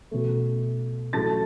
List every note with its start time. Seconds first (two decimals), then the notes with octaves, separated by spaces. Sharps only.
0.11 B2 A3
1.13 A2 F#3 A3 A5 A6